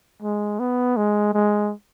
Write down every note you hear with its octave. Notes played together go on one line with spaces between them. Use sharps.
G#3
B3
G#3
G#3